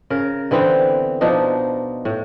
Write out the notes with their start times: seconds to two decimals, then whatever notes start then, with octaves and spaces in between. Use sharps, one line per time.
0.10 C#3 A#4
0.51 D3 E3 B3 C4
1.21 B2 F3 D4 D#4
2.05 A2